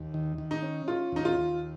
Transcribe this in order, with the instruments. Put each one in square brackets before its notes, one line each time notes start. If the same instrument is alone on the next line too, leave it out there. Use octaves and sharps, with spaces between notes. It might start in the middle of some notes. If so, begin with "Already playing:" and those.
Already playing: [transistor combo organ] D#2
D#3
D#3
[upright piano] D#4
[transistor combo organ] C#4
[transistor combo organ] C#4 [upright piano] F4
[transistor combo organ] D#2 [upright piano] D#4
[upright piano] F4
[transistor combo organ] D#2